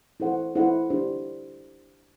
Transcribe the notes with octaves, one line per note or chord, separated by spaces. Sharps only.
E4 A4 C5 F#5
E4 A4 C5 F#5
D4 G4 C5